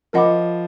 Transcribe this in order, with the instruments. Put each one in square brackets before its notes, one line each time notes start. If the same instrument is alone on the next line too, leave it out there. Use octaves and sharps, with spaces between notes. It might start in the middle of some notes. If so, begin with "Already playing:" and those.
[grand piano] F3 [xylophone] A#4 D#5 F#5 B5 D6